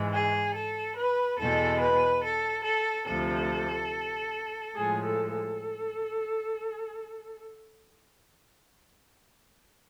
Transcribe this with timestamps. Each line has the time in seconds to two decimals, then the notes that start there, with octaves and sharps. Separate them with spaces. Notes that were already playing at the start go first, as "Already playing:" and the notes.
Already playing: G#2 E3 G#3
0.12 G#4
0.54 A4
0.96 B4
1.38 E2 B2 G#3 A4
1.80 B4
2.23 A4
2.65 A4
3.07 D2 C3 F3 A4
4.75 A2 F3 G#3 G#4
5.04 A4
5.32 A4